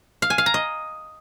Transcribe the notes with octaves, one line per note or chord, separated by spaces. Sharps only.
F5
G#5
F5
A#5
D#5